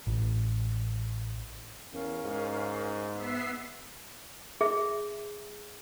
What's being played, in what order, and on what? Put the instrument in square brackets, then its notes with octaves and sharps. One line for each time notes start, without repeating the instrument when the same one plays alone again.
[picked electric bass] A1
[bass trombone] E2 [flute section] C#4 A#4 F5
[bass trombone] G#2
[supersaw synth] B3 E5 C7
[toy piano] G#4 E5